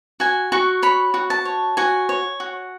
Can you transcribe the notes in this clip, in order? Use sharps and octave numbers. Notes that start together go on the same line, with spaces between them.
F#4 G#5
F#4 C#6
C#5 B5
F#4
A5
C#5
F#4 G#5
C#5
F#4